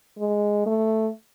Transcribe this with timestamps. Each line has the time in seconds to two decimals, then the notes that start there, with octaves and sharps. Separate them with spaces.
0.19 G#3
0.66 A3